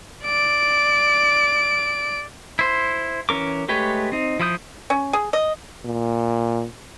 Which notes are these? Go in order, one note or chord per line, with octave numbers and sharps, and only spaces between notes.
D5 D7
E4 C5
E3 C#4 A#4 D6
G#3 A3 G4 B4 C#5
C4 D#4
F3 E4 D#6 G6
C#4
G#4
D#5
A#2